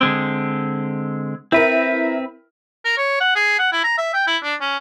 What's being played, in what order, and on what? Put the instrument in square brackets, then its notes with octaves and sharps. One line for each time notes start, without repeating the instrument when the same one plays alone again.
[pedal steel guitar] D3 G#3 C4
[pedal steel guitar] C4 B4 [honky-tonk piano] E4 A#4
[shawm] A#4
C#5
F#5
G#4
F#5
E4
A#5
E5
G5
E4
D4
C#4